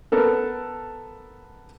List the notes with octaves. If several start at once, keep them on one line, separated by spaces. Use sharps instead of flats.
B3 A4 A#4